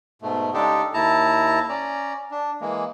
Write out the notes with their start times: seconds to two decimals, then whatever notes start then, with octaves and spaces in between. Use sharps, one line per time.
0.22 G#2 B2 A3
0.54 C#3 G#3 D4 D#4 G4 A4
0.94 D#2 E4 A5 A#5
1.69 C#4 D5 A#5
2.31 D4
2.61 E3 G#3 A#3